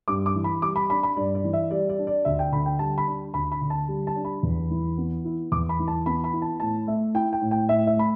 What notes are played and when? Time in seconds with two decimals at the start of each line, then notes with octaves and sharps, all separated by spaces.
0.08 G2 D6
0.26 D6
0.35 E3
0.44 B5
0.62 G3 D6
0.76 B5
0.90 D4 B5
1.03 B5
1.17 G2 D5
1.35 D5
1.44 E3
1.53 E5
1.71 G3 D5
1.89 D5
1.99 D4
2.07 D5
2.25 D2 E5
2.39 G5
2.52 D3 B5
2.66 G5
2.79 G3 A5
2.98 B5
3.07 D4
3.34 D2 B5
3.52 B5
3.61 D3
3.70 A5
3.88 G3
4.07 A5
4.16 D4
4.25 B5
4.43 E2
4.71 E3
4.97 B3
5.25 E4
5.52 E2 D6
5.69 B5
5.79 E3
5.88 A5
6.06 B3 B5
6.24 B5
6.33 E4
6.42 A5
6.60 A2 A5
6.87 A3 E5
7.14 E4 G5
7.33 G5
7.41 A2
7.51 G5
7.69 A2 E5
7.87 E5
7.96 A3 B5